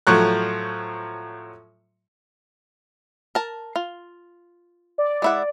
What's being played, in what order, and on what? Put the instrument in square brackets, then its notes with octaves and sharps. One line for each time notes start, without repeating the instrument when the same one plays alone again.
[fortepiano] A2 F3 F#3 C#6 F#6
[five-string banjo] A#4 A5
F4
[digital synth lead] D5
[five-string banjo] G#3 E4 F#5